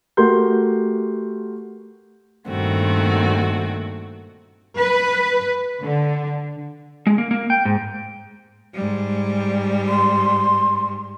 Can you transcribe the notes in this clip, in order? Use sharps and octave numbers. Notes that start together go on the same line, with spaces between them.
A3 F#4 G4 A#4 C6 G6
G2 A#2 D#3 A3 C4 F#4
B4
D3
G#3
A#3
A#3
G5
G#2
G#2 G3
C6